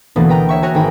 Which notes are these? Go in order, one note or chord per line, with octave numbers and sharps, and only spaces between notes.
D2 B2 E3 A#3 B3
B4 G5 A#5
C#5 E5 C#6
F#4 C#5 G#5 A#5 F#6
G#1 D#4 A#4 G5 B5